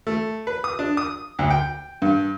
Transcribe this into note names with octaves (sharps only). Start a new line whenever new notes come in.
A3
B4
D#6
D4
D#6
D2
G5
G2